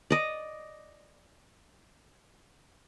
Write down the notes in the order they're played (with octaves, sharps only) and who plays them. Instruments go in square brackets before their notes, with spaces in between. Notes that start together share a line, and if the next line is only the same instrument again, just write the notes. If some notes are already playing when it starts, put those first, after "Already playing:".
[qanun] D5 D#5